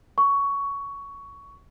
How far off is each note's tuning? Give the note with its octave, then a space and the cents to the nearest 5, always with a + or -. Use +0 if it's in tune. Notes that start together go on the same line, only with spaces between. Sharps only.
C#6 +15